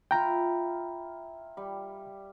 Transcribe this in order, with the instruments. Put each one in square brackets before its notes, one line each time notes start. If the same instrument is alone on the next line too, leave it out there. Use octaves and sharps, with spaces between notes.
[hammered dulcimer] E4 F4 [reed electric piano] G5 A#5
[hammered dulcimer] G3